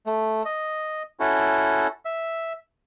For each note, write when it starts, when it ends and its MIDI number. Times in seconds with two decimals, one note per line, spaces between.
0.06 0.43 57
0.45 1.03 75
1.20 1.87 61
1.20 1.87 64
1.20 1.87 66
1.20 1.87 69
2.05 2.53 76